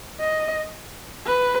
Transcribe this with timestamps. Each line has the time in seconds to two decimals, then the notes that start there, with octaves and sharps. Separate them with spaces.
0.20 D#5
1.26 B4